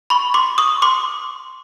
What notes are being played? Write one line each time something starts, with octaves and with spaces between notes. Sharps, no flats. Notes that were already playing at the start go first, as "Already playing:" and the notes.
B5 C#6
C6 D6
C#6 D#6
C6 D6